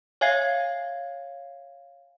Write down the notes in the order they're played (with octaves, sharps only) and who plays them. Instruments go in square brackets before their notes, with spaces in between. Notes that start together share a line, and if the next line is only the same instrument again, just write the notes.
[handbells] C#5 E5 F5 G#5 G#6 C7